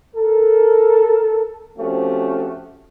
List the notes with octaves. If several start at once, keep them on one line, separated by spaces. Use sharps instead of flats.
A4 A#4
F3 A3 C4 C#4 F#4 G4